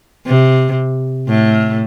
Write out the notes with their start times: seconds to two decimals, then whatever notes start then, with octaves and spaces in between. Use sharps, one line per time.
0.27 C3
1.28 A2